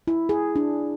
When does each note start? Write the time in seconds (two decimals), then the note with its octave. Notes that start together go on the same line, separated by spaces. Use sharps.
0.07 E4
0.29 G#4
0.56 D4